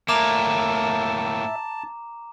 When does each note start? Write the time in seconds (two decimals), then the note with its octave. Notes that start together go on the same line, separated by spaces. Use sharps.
0.08 A2 A#3 E5 A5 A#5 D6 E7